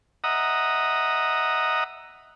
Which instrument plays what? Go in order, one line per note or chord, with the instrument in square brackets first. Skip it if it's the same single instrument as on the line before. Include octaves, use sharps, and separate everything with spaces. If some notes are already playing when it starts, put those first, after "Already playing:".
[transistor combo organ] D#5 E5 F#5 A#5 D#6